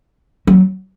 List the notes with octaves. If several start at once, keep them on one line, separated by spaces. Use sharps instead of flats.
F#3